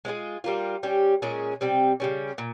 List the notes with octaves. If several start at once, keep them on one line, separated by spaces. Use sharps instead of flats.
G#3 C4 F4 G#4
G3 A#3 F4
G3 C#4 G4
A#2 G#3 C#4 G#4
C3 G3 C4
C#3 G3 C#4
A#2